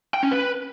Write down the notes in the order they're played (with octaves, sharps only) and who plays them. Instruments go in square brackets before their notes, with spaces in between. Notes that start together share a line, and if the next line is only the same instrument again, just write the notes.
[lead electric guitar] G5
C#4
B4